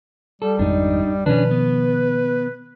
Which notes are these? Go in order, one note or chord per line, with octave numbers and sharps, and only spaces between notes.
G3 A4
G#1 F2 G#3 D4 D#4
B2 D#3 F3 C#4 D4 B4
B3